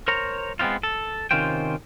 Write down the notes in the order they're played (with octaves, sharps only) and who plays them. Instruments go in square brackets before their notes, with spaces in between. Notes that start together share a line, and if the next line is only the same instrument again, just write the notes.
[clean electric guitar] A#4 C5 C#5 A#5
G#3 B3 C4 D#4 F4
A4
C3 D#3 C#4 F4 C5 G5